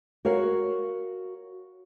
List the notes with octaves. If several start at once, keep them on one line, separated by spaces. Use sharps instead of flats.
F#4 A#4 C#5 F5